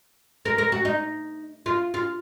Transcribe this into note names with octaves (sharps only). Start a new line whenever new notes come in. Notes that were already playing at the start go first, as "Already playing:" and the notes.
A#4
A#4
F#4
D#4
F4
F4